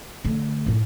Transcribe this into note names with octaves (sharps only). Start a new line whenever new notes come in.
D3 A3
F#2 A2